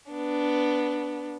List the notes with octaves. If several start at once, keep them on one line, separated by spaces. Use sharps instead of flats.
B3 D4